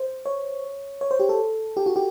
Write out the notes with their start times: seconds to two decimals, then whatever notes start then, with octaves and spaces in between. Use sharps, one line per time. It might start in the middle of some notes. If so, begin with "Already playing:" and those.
Already playing: C5
0.26 C#5
1.01 C#5
1.11 C5
1.20 G4
1.29 A4
1.77 G4
1.86 F#4
1.96 G4